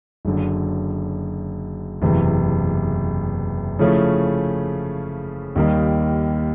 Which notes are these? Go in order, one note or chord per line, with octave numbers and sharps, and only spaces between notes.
F#1 F#2 D3
F#1 E2 C3 E3
C#3 F3 A3 C#4 E4
D#2 D#3 G3 A#3 D#4